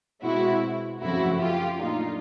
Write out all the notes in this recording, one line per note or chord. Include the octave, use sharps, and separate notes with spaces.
B2 G#3 C4 E4 F#4
F#2 C#3 F3 A3 C4 E4 F#4
F4 G4
A#2 F#3 A3 D4 D#4 F4